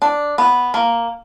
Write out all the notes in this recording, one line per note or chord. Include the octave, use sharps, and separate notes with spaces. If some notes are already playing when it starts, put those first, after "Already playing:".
D4
B3
A#3